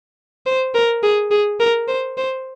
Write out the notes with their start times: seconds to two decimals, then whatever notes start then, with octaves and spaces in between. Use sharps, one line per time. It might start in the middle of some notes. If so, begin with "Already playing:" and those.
0.46 C5
0.74 A#4
1.03 G#4
1.31 G#4
1.60 A#4
1.88 C5
2.18 C5